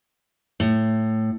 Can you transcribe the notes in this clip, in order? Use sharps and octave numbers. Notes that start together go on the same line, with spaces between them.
A2